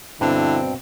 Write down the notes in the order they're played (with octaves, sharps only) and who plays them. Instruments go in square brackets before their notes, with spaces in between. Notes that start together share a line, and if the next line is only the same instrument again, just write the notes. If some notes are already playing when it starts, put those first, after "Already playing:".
[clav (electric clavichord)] G2 [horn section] B2 C4 [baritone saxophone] D3 [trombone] E4